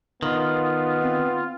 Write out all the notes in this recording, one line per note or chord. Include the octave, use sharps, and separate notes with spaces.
D#3 B3 F4
C4